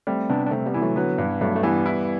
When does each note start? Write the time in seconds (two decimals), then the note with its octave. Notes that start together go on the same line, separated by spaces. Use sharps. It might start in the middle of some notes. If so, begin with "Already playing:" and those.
0.07 G3 A3 C4
0.30 C3 B3 D4
0.46 D4
0.51 C3 A3 C4
0.66 G3 B3
0.74 E3
0.82 F#3 A3
0.96 D3 F#3 B3
1.18 G2
1.41 G2 F#3 A3
1.56 A3
1.63 E3 G3 B3
1.86 E4